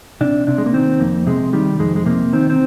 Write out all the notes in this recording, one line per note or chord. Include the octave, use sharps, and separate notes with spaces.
C3 D4
C3 D4
G#3
A#3
D#3 C4
F2 A#3
C3 G#3
D#3 G3
F2 G#3
G#3
C3 A#3
D#3 C4
C4